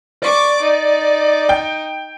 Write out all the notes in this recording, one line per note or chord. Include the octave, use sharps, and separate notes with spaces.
D5 C#6 D6
D#4
G5